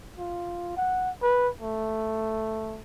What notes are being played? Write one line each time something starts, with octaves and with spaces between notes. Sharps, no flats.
F4
F#5
B4
A3